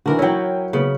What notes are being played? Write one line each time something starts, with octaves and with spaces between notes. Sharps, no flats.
D3 E3 F#4 A#4
F#3 C#4 E4 G5
C#3 B3